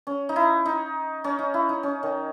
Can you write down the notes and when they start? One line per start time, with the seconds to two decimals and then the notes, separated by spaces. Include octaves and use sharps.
0.07 C#4
0.29 D#4
0.36 E4
0.66 D#4
1.24 C#4
1.39 D#4
1.54 E4
1.69 D#4
1.83 C#4
2.03 D#3